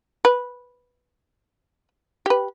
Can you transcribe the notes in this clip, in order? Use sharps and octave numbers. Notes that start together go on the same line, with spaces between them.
B4
G4 B4